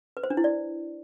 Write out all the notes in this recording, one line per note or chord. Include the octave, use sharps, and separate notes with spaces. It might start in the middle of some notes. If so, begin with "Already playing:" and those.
B4
C5
D4
E4
D5